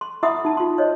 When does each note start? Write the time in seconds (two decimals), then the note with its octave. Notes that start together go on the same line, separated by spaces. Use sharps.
0.01 C6
0.23 E4 E5 F#5 B5 C6 D#6
0.45 D#4 A5
0.57 F4 C6
0.78 C5 C#5 D#5